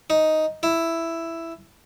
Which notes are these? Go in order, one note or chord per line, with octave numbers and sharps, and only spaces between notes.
D#4
E4